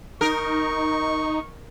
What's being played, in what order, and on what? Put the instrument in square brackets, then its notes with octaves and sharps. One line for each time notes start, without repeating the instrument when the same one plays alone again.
[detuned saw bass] D#4 [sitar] A#4 [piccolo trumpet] C#6